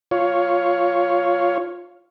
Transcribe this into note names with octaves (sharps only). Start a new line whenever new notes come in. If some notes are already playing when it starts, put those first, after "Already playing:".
F4 C#5